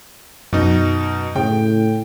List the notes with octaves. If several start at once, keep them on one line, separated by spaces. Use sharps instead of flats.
F#2 B2 D#4
A2 C#3 G5